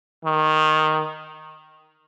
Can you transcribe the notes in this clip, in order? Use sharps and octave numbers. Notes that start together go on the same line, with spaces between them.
D#3